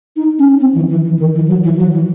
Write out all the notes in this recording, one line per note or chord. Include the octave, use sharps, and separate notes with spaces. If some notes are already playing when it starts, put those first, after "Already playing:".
D#4
C#4
C4
E3
E3
E3
D#3
E3
F#3
E3
F#3
E3